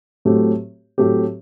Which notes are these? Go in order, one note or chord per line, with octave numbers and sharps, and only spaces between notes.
A2 F#3 A3 C4 G4
A2 F#3 A3 C4 G4